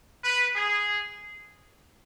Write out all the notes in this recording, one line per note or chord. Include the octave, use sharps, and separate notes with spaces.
B4
G#4